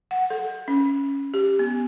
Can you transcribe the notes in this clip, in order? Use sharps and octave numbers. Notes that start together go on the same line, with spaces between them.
F#5
A4
C#4
G4
B3